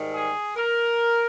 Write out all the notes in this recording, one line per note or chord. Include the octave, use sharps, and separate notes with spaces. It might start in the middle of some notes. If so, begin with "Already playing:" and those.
Already playing: G#2 D#3 G3
G#4
A#4